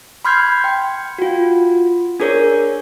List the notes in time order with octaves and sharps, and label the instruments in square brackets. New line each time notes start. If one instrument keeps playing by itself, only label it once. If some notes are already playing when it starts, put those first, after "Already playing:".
[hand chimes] B5 C6 F6 G6 G#6 C7
G5
F4 F#4
D4 G#4 A#4 C#5